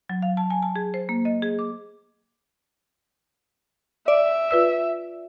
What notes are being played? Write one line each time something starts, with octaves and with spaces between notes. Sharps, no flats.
F#3
F5
A5
G#5
A5
G#4
C5
A#3
D#5
G#4
D6
D5 E5
F4 B4 E6